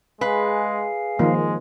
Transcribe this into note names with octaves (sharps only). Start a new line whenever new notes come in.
G#3 G#4 B4 F5
D#3 F3 G#3 A#3